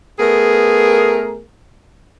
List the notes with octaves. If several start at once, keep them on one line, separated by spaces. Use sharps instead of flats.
A3 B3 G#4 A#4